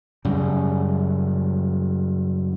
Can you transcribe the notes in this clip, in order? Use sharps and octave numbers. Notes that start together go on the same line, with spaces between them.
F#2 C#3 G3